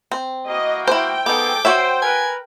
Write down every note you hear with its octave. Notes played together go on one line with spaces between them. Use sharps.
C4
E3 A#3 F#4 D#5
E4 C5 G5
F3 B3 D#4 G#4 A4 D6
F#4 C5 C#5 E5
A#4 B4 G#5